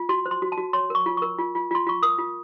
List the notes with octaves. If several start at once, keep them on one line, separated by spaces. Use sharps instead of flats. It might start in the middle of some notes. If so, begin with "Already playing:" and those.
Already playing: F4
F#4 C6
C5
C6
F#4
A5
F#4
C#5 C6
A#4 C#6
F4
A#4 C#6
F4
F4
F4 C6
F4 C#6
A#4 D#6
F4